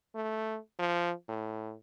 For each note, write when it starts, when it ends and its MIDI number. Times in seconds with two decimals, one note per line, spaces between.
0.15 0.59 57
0.79 1.13 53
1.28 1.74 45